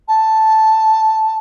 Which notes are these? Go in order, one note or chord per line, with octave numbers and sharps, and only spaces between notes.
A5